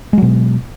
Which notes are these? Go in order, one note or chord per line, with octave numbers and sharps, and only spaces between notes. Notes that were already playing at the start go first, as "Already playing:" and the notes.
B2 F#3 G#3